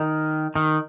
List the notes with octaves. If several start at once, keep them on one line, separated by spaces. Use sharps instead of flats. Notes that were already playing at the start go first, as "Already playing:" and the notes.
Already playing: D#3
D#3